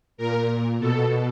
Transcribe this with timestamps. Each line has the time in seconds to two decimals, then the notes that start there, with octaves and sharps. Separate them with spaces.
0.18 A#2 A#4
0.79 B2 A4